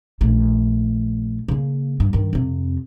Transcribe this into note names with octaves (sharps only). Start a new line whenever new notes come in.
A#1 A3
C#3 A#3
G2
G2 D#3
F2 C3